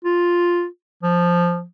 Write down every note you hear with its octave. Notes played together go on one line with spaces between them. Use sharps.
F4
F3